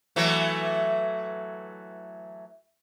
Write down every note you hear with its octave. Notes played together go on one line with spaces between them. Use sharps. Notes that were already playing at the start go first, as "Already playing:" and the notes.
E3 F#3 A3